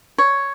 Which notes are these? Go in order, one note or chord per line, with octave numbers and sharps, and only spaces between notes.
C#5